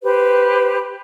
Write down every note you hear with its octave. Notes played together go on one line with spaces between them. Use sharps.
G4 B4 C5